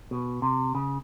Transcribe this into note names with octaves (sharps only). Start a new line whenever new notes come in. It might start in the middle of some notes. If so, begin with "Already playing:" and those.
B2
C3
C#3